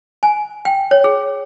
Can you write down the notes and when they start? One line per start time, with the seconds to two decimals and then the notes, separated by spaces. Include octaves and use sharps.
0.23 G#5
0.65 G5
0.91 C#5
1.04 G#4